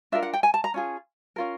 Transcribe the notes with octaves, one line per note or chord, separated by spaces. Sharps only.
D4 F4 A#4 E5
F#5
G5
G#5
A5
A#5
C#4 F4 G#4
C#4 F4 A#4